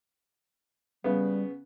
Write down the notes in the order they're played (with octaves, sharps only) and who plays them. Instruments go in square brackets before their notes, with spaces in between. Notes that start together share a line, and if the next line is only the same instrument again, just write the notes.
[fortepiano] C#3 B3 [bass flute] G3